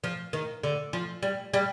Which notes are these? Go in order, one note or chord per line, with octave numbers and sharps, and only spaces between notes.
F3
D#3
D3
F3
G3
G3